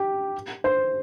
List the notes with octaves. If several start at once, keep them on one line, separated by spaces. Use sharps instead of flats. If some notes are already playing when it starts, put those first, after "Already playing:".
Already playing: G4
C5